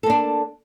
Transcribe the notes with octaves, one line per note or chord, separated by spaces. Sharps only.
A#3 D4 A4